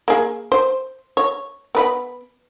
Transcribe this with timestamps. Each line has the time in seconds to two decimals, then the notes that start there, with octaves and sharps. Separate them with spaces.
0.08 A#3 G#4
0.52 C5
1.17 C#5
1.75 B3 B4 B5